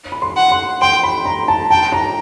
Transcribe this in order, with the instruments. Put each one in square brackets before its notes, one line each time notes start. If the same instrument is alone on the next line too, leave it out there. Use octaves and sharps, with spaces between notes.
[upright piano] B5
C6
[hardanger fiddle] F#5
[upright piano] C6
[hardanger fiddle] G5 [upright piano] C6
[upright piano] B5
A#5
A5
[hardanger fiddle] G5 [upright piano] A5
[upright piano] A#5